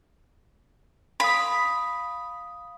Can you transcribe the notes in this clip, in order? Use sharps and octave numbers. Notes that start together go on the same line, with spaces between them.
F5 B5 D#6